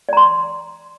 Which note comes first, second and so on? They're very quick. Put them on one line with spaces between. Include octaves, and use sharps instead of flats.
D5 A#5 C6